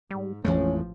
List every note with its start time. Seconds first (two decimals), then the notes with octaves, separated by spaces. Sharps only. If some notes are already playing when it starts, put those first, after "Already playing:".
0.11 G#2 G3
0.45 A1 F2 E3 F3 G#3 A3 C#4